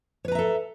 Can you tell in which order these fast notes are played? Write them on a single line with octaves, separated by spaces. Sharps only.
C#5 B4 A#5 E5 A4